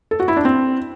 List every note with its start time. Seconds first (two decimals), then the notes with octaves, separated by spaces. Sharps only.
0.11 A4
0.20 F#4
0.28 E4
0.36 D4
0.45 C4